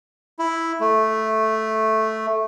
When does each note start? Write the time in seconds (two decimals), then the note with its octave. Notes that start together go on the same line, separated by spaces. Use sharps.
0.39 E4
0.80 A3